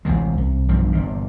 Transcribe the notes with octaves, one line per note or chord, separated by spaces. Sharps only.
A1 D2 C3 G#3
C2
B1 G2 F3
G1 A#2